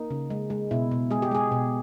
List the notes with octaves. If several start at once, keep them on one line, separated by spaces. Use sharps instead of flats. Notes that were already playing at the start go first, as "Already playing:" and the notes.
Already playing: A#3 D#4
C#3
G#3
G#3
B2 E4
B2
G#3 G#4
G4
G#3 G#4
B2